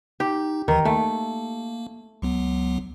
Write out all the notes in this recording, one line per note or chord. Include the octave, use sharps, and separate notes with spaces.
D#4 G4
D#2 D#3 E3
A3 A#3
C#2 F#3 B3